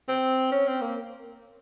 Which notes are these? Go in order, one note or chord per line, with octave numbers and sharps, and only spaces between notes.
C4
C#4
C4
A#3